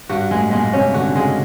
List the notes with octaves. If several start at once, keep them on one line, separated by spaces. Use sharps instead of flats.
G2 F#4
A2 G#3
A#2 G#3
C3 C#4
D3 F#4
C#3 G#3